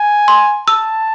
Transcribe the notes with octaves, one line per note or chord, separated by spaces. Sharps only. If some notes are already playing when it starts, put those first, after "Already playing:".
Already playing: G#5
C6
A5 E6